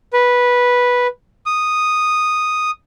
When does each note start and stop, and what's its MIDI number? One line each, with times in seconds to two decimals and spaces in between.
0.13 1.07 71
1.46 2.71 87